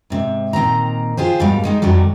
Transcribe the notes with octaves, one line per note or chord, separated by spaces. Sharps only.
G#2 C3
A#2 D#3 C4 A#5
F4 G4 G#4 C5
D#2 G#2 B2 G3 F5
D#3 G#3 D#4
F2 D#3 F#3 G3